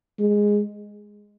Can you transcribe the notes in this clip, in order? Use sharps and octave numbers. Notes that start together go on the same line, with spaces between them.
G#3